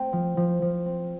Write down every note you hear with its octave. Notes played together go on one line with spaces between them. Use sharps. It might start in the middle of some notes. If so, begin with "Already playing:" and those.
Already playing: A3 C4 G5
F3
F3
F3
C4